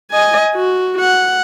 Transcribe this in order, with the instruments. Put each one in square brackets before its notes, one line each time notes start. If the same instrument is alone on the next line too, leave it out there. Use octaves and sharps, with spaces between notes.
[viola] D#5 G#5
F#4
F#5